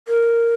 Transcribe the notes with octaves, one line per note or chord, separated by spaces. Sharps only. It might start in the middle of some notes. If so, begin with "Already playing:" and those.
A#4